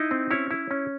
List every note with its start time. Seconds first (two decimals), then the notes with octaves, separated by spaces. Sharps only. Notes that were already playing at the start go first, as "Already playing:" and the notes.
Already playing: D#4 E4 D#5
0.11 C4
0.31 C#4 E4 C#5
0.51 E4
0.71 C#4